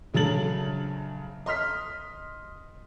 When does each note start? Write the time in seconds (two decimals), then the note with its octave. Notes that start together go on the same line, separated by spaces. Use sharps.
0.14 A#1 C#3 F#3 A4 A6 F#7
1.46 D#5 C6 F6 B6